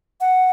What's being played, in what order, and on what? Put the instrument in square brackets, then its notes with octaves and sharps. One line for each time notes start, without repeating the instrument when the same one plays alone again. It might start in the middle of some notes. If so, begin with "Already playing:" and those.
[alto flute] F#5